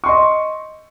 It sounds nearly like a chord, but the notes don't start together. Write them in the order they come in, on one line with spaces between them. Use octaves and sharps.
C#6 C6 D#5